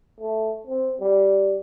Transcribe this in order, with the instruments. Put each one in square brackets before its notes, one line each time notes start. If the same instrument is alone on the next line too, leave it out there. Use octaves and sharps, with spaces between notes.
[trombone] A3
C4
G3